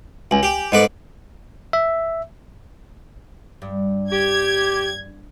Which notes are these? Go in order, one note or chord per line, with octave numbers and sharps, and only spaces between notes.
C#2 G#5 F#7
G4
G#2 A4 B4 D5 D#5
E5
G2
G4 G#6